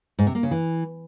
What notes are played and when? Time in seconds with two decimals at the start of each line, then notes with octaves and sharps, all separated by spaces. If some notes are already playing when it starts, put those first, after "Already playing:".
0.19 G#2
0.27 C3
0.35 A#3
0.43 C#3
0.51 E3